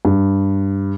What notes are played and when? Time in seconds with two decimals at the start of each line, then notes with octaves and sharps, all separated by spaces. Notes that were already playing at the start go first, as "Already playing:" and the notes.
0.05 G2